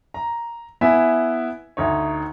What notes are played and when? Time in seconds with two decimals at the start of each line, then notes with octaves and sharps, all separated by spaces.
0.14 A#5
0.81 B3 E4 E5 G#5
1.77 D2 D#4 C#5